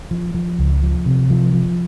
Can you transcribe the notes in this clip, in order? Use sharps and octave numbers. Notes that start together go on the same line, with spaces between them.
F3
F3
C#2
F3
C3
F3
F3